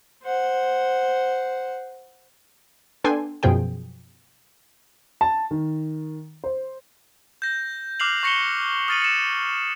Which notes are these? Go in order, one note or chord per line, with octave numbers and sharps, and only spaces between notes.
C5 F#5
B3 D4 A4 G5 G#5 C6
F#2 B2 F3 G#4 G5
A5
D#3
C5
G6 A#6
D6 F6 F#6 C7 F7 F#7
C#6 A#6 C#7 E7 G7
D#6 F6 A6 C#7 D#7 F#7
C#7 E7